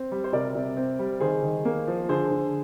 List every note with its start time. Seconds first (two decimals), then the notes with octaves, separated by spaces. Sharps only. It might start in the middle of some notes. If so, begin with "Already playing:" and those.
Already playing: C4
0.12 G3
0.24 C5
0.32 C3 A#4 D5
0.55 C3
0.77 C4
0.99 G3
1.20 D#3 G#4 C5
1.43 D#3
1.65 A#3
1.87 F3
2.09 D3 G#4 C5
2.31 D3